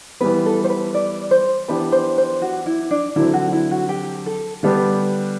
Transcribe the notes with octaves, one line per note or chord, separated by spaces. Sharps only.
E3 G3 B3 B4
A4
C5
B4
D5
C5
E3 B3 D4 G4 B4
C5
C5
F#4
E4
D4
D3 F#3 C4 E4
F#4
E4
F#4
G4
A4
D3 G3 B3 D4 G4